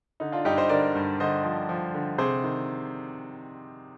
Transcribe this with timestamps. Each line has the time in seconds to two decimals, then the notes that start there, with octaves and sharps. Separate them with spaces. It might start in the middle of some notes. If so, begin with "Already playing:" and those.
0.20 D3 D#4
0.32 D4 F4
0.45 G2 D#4 G4
0.57 C5 D#5
0.69 D3 A#4 D5
0.95 G2
1.20 D3 C5 D#5
1.44 F3
1.69 F3
1.94 D3
2.18 C3 G#4 C5
2.44 D#3